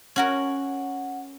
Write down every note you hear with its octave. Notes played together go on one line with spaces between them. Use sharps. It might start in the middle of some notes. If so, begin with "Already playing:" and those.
C#4 F#4 A#4 F#5